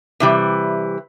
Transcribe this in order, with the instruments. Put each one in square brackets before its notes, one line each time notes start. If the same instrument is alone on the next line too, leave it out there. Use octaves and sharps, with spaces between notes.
[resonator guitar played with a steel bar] C3 E3 G3